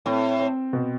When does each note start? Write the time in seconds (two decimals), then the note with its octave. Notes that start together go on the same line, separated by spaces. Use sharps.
0.06 A2 C4
0.40 C4
0.73 B2